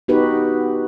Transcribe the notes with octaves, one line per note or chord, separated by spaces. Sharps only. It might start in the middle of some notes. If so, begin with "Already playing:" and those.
B3 D#4 F#4 G4 B4